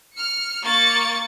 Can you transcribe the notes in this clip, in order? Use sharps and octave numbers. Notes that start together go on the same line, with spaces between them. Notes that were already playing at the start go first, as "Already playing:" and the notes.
F6 C#7
A#3 C#6 A6 C#7